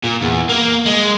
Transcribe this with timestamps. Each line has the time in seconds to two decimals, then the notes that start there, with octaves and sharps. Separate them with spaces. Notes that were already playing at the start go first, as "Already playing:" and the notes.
0.04 A#2
0.22 E2
0.49 A#3
0.86 G#3